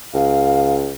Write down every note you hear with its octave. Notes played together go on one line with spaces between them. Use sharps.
C#2 F5